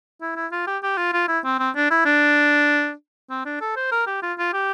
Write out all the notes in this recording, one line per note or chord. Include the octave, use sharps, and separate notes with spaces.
E4
E4
F4
G4
G4
F4
F4
E4
C4
C4
D4
E4
D4
C4
D4
A4
C5
A#4
G4
F4
F4
G4